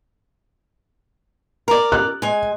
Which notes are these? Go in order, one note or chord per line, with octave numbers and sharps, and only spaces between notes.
A#4 D5
F#6
G#3 G#5